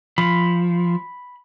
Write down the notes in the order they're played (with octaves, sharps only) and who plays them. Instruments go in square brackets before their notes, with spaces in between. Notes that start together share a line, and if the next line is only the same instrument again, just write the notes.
[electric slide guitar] F3 [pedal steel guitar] B5